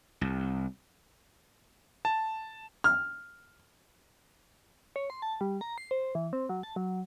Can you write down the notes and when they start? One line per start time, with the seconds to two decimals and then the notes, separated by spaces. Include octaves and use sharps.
0.21 C2
2.05 A5
2.84 F6
4.96 C#5
5.10 C6
5.22 A5
5.41 G3
5.61 A#5
5.78 C7
5.91 C5
6.15 E3
6.33 C4
6.49 F#3
6.63 A5
6.76 F#3